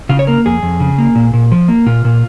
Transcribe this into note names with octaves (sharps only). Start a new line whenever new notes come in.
C#3 F4
C#5
A#3 A#4
F2 G#4
F2
C#3
A#3
A#2
A#2
F3
A#3
A#2 F4
A#2